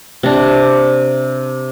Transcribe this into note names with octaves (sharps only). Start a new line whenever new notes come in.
C3 D4